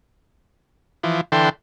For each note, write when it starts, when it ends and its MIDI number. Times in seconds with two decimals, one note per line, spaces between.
1.03 1.21 52
1.03 1.21 53
1.32 1.49 50
1.32 1.49 52
1.32 1.49 69
1.32 1.49 79
1.32 1.49 84